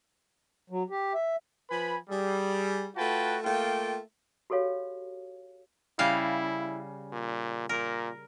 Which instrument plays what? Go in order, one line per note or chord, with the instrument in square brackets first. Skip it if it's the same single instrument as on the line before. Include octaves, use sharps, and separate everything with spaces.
[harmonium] F#3
G4
E5
[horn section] F3 B4 G#5 B5
G3 G#4
A3 F4 F#4 B4 G5 A5
A3 A#3 F4 G5
[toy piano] F#4 G4 A4 C#5 F5
[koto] C#3 G3 F5 [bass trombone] E4
[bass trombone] A#2
[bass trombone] A#2 [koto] A#4